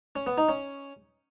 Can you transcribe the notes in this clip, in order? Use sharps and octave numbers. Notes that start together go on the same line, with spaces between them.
C#4
B3
D#4
C#4